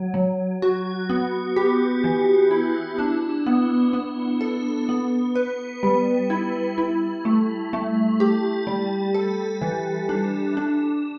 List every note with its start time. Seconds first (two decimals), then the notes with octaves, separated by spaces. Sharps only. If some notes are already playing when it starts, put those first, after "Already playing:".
Already playing: F#3
0.14 F#3
0.62 F#4
1.10 B3
1.56 G4
2.04 E3
2.51 E4
2.99 D4
3.46 B3
3.93 B3
4.41 A4
4.89 B3
5.35 B4
5.83 G3
6.30 E4
6.78 E4
7.25 A3
7.73 A3
8.20 G4
8.67 G3
9.14 A4
9.62 E3
10.09 D4
10.57 D4